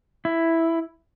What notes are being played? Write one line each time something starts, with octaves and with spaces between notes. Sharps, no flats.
E4